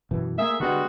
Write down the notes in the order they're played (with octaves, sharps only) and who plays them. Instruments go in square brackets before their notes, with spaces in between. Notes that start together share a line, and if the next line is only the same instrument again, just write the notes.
[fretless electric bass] F#2 B2 E3
[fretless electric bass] A3 A#3 [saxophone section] G#4 E5
[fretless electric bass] D3 B3 [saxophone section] G3 G#3 F#4